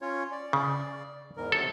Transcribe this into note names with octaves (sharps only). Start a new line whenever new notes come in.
C#4 F4 C#5
D5
C#3
E2 G#2 A#4
C3 F#3 A4